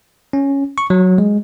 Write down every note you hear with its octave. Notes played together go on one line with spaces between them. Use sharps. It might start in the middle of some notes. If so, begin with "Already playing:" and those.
C#4
C#6
F#3
G#3